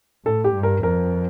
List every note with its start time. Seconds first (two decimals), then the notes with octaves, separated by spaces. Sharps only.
0.25 A2 A4
0.44 G4
0.54 G2
0.63 A#4
0.83 F2 A#4